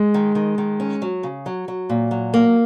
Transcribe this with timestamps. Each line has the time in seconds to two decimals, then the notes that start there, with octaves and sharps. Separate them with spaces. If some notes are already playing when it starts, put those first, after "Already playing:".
Already playing: G#3
0.14 D#3
0.35 D#3
0.58 D#3
0.80 C#4
1.02 F#3
1.23 C#3
1.46 F#3
1.68 F#3
1.90 A#2
2.11 F#3
2.34 A#3